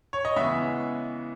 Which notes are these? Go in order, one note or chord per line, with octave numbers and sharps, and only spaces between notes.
C#5
D#5
C#3 E3 G#3 B3 E5